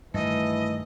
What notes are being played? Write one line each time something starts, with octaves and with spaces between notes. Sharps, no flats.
G2 D#3 E3 A3 D#5 E6